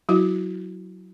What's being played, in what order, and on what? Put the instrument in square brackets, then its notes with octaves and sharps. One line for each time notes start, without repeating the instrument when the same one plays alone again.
[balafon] F#3 E4 F#4